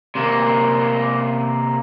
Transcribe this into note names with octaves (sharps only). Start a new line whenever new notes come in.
C3 A#3